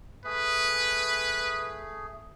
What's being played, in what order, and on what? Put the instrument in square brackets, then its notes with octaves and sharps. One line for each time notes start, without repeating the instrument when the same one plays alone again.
[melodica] A3 G#4 [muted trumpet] B4